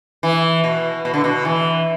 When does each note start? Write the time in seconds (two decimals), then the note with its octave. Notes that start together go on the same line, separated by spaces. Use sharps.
0.23 E3
0.64 B2
1.05 B2
1.14 D3
1.24 B2
1.45 E3